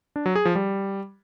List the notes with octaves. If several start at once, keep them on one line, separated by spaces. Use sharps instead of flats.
D4
F#3
G#4
F3
G3